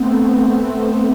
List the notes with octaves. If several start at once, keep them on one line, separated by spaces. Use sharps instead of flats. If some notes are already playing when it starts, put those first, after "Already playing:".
Already playing: A3 B3 C4
B3